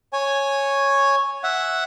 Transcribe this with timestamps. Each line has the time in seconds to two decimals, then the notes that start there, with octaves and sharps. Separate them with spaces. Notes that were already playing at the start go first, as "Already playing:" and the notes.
0.13 C#5 G#5
1.44 E5 F#5